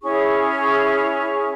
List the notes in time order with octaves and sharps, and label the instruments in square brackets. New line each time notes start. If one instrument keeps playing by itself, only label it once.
[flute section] C#4 E4 G#4 C#6